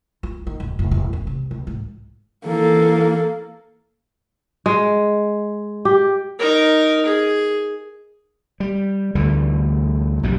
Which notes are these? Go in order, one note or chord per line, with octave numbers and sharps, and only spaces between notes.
F4
D#3
D#1
F1
E1
C#4
C3
C#2
G#2
E3 A#3 A4
G#3
G4
D#4 A#4
G#4
G3
D2 D3 E3 G3
A#1 F#2 B2 G3